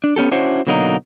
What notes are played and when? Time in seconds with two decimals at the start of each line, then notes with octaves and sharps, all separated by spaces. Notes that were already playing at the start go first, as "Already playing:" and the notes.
0.04 D4
0.16 B3 C#4 G4 A4
0.31 C#4 D4 E4 F#4 C5 C#5
0.67 B2 D3 F#3 A#3 D#4